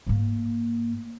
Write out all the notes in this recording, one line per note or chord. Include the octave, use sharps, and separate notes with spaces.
G#2 A#3